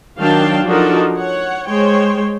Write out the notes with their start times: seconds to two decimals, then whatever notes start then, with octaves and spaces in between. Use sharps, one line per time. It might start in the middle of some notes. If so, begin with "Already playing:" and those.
0.18 D#3 F#3 D4 F5 G5 A5
0.65 F3 D4 D#4 F#4 A4 A#4
1.16 C#5 F#5
1.68 G#3 C5 C#5 G5